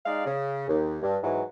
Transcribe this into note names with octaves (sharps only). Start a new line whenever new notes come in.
G#3 D#4 D5 F5
C#3
D#2
G2
G#2 E3 F#3